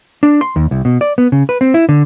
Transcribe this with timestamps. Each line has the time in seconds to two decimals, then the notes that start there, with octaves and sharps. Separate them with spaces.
0.23 D4
0.41 C6
0.56 D#2
0.71 C2
0.85 B2
1.01 D5
1.18 B3
1.32 C#3
1.49 B4
1.61 C4
1.74 E4
1.89 D3